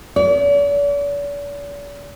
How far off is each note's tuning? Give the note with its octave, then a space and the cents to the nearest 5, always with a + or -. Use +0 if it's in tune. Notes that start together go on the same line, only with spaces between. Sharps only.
D5 -45